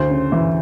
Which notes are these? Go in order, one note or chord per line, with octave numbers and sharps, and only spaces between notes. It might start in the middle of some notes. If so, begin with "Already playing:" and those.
Already playing: D2 C5 C6
C#3
E3